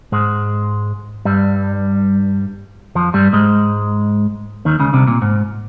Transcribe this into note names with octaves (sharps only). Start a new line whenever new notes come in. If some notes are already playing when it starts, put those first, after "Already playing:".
G#2 G#3
G2 G3
F2 F3
G2 G3
G#2 G#3
D#2 D#3
C#2 C#3
C2 C3
A#2
G#2